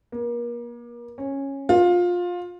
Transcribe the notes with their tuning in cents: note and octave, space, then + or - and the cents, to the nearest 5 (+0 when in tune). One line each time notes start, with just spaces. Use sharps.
A#3 +35
C#4 -15
F4 +20